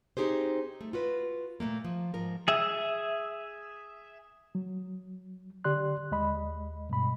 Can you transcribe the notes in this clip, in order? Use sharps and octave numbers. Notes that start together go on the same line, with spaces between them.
C4 D#4 G4 G#4 C5
A3
F4 F#4 B4
A#2 F3 A3 A#3
F3
G#2 F3 A#4
G#4 E5
F#3
D3 G4 D5 C6 F#6
D#2 G#3 D#5 B5
G2 B2 B5